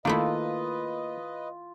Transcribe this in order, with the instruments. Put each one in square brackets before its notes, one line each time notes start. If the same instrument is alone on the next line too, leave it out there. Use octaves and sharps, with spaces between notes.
[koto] D#3 A3 E4 [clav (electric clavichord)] A#3 [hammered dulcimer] F4 [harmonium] B4 D#5